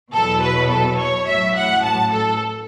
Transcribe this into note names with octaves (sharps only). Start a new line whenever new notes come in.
E2 B2 F#3 A4
B4
A4
C#5
A1 A2 F#3 E5
F#5
A5
A4